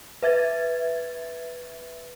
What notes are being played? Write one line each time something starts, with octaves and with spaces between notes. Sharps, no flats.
B4 E5 G#6 A6